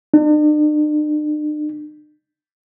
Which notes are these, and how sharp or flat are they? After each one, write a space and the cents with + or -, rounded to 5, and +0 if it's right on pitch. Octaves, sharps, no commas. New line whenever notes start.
D4 +45